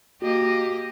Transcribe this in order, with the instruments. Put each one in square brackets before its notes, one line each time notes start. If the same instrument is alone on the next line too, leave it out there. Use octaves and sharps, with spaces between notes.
[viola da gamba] A#3 G4 D#5 [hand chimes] F#4